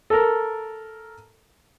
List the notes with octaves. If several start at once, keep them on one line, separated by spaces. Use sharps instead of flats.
A4 A#4